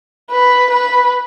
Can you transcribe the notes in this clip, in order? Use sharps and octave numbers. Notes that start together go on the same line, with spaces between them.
B4
B4